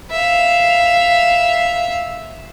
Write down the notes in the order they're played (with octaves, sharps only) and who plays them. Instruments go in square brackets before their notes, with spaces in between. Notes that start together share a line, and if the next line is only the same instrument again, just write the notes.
[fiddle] E5 F5